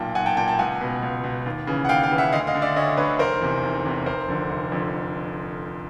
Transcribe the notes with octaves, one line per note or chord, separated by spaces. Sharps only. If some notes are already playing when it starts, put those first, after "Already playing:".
Already playing: B1 A#2 G5 A5
B1 F#5 G#5
G5 A5
A#2 G5 A5
G5 A5
C#2 F#5 G#5
B2
C#2
B2
D#2
C#3 E3
F#5
D#2 F5 G5
F5 G5
C#3 E3
E5 F#5
D2 D#5 F5
D#5 F5
D3
D5 E5
D2 C#5 D#5
D3 B4 C#5
F1 A#4 C5
E2 C3
F1
E2 C3
F1 A#4 C5
F2 D3
F1
F2 D3